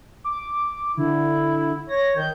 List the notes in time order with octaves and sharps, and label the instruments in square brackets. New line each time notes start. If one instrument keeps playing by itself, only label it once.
[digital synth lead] D6
[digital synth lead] D3 [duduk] E4
[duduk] C#5 [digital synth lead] A#6
[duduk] D#3 [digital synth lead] G6